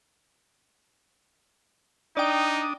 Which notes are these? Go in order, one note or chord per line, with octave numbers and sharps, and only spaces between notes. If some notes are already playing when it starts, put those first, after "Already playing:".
D4 D#4 D5 G5 D#6